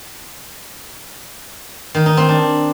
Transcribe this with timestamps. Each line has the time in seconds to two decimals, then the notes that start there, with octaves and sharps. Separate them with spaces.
1.95 D#3
2.06 D#4
2.17 C4
2.29 D4